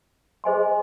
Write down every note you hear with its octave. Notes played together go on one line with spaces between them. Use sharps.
G#4 C5 D#5 G#5 C6